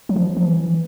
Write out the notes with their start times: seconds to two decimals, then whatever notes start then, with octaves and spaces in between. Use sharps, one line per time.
0.09 F#3
0.16 F3
0.37 F3
0.47 E3